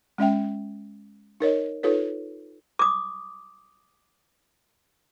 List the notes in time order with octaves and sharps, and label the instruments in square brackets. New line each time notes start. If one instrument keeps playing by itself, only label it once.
[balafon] G#3 C#4 E5 G5
D#4 A#4 C#5 D#5
D#4 F4 A4 B4 C#5
[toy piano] D6 D#6